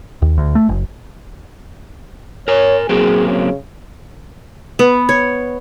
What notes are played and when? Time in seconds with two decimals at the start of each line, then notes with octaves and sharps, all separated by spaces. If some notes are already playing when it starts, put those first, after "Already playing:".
0.22 D#2
0.38 D2
0.55 A3
0.69 F#1
2.48 A#4 C#5 G#5
2.89 F#3 A#3 C4 G#4
3.28 C#3
4.79 B3
5.09 C#5